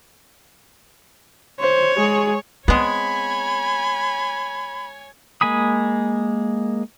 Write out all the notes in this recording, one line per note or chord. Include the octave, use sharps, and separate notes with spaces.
C5 C#5
G#3 G#4
G#3 B3 C4 C#5 G#5 B5
G#3 A#3 G#5 B5 D#6